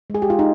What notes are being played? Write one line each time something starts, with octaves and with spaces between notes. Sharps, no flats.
G#3 G#4
G4
G#3 F4
D#4